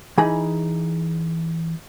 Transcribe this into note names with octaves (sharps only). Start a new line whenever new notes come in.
E3 D#4 G#4 B5